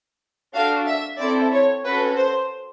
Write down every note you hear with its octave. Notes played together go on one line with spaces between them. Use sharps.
D4 F#4 A4 F5
E5
C4 E4 A4 D5
C#5
C#4 F#4 A4 B4
C5